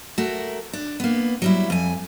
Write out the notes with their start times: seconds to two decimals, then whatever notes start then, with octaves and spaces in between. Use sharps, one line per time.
0.18 A3 F#4 A#4
0.73 D4
1.00 A#3 B3
1.42 F#3 G3 E4
1.70 F2 G#5